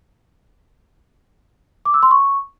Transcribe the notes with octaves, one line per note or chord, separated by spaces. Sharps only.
D6
E6
C6
C#6